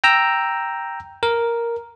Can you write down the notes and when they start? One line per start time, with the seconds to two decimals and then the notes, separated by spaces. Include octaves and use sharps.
0.04 G5 A#5 E6
1.23 A#4